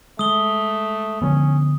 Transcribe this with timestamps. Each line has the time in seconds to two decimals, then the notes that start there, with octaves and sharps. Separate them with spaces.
0.19 G#3 A3 D#6 G7
1.22 D3 F3 B3 C#4